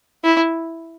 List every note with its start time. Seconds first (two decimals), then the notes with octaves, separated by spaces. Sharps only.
0.24 E4